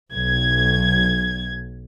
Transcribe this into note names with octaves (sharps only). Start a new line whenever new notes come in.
B1 G#6